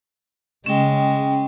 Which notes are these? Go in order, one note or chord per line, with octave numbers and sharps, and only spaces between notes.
C#3 G#3 C#4 G5